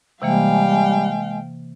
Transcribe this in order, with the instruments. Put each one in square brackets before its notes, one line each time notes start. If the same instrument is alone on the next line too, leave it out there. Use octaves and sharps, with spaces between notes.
[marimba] C3 E3 A#3 [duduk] G3 [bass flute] G#3 [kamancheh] F5 G5